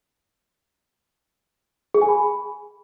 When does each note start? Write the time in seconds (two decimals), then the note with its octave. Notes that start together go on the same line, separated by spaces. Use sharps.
1.94 G#4
2.02 G#5
2.09 B5